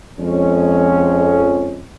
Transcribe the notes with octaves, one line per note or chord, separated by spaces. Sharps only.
F2 G#3 C#4